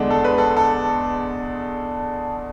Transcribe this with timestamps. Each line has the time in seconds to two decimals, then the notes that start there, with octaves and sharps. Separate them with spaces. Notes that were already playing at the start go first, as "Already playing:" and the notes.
Already playing: E2 D3 G#3 D4
0.10 A4
0.24 B4
0.38 A4
0.57 A4